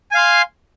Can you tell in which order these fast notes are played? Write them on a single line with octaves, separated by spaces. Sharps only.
G#5 F5 C6